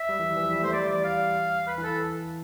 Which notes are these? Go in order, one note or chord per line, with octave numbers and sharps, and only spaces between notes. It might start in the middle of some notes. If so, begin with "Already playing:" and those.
Already playing: E5
G3
E3
G3
E3
F3
G3
A3 C5
G3 D5
E3 D5
F5
B4
E3
A4